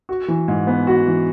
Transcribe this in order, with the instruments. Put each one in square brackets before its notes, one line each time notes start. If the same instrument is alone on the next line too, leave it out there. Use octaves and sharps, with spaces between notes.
[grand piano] F#4
E3
G#2
B3
F#4
E3